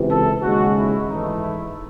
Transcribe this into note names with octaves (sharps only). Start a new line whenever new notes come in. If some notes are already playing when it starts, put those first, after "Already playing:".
Already playing: C#2 C3 E3
A4
D#2 C#3 G#3 F#4
E4
G#2 E3 A3 D#4
E4